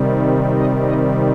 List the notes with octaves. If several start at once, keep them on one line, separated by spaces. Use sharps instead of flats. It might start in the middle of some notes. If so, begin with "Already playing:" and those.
Already playing: C3 D#3 G3
D#5
D#5